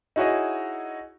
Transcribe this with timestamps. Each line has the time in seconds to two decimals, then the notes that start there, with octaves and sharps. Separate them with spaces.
0.16 D#4 E4 F#4 G#4 C#5 D#5